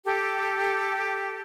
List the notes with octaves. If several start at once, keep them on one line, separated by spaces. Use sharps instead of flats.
G4 A4